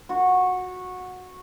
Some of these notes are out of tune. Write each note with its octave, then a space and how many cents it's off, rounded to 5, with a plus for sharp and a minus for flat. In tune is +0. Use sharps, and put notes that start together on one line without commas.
F#4 -15